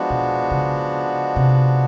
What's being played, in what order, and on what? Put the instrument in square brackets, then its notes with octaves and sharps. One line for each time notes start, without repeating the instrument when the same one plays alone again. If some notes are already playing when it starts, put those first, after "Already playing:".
Already playing: [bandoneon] F3 G#3 B3 D4 F#4
[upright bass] B2
C#3
C3